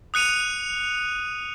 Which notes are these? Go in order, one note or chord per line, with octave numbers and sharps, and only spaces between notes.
D#6 F#6 C#7 D#7 F7